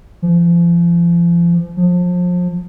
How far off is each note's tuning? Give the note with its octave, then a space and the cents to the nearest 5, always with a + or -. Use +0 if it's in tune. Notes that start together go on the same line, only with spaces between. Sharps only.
F3 -35
F3 +30